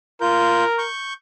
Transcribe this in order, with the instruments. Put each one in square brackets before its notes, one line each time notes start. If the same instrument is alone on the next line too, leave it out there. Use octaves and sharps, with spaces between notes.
[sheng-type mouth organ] F4 G6 [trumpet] A#4
[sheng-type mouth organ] C#6 G6